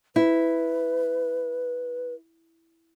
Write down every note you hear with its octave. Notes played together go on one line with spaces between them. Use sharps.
E4 B4